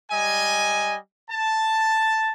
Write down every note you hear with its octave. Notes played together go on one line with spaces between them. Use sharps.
G3 D#5 G#5
A5